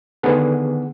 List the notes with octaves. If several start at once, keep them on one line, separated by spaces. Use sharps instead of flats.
D3 D#3 B3 G#4 F#5